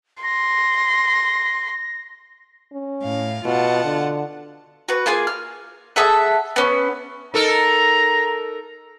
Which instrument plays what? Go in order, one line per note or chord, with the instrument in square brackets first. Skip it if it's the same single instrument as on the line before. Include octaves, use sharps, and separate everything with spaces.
[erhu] C6 [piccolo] A#6
[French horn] C#4
[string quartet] A2 F5
[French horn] B2 [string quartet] F4 F#5 A5
[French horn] D3
[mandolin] F#4 B4
A#3 F4 G#4 G#5
F6
G#4 A4 E5 F#5
B3 C#4
[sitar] D#4 A4 A#4 [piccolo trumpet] A#5